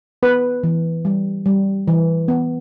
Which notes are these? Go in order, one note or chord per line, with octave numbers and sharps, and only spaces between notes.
B3 B4
E3
G3
G3
E3
B3